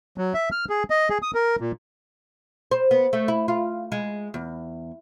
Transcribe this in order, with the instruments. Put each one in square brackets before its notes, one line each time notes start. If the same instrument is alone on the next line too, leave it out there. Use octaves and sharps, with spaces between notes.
[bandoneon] F#3
E5
F6
G#4
D#5
G#4
D#6
A#4
A#2
[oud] C5
B3
A3
E4
F4
G#3
E2